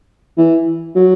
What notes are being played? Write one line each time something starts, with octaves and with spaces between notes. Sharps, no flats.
E3
F#3